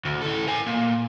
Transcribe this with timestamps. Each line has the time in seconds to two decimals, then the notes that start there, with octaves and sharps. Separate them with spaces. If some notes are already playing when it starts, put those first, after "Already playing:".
0.05 D2
0.21 E3 A4
0.47 A#4 G#5
0.66 A#2